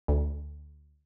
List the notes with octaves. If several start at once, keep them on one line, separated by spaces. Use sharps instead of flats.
D2